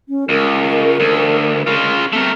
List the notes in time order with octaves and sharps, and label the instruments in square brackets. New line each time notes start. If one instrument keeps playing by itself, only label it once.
[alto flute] C#4
[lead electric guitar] C#2 [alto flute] A#4
[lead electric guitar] D2
C#3 F4
[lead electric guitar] A3 A#4 [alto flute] C4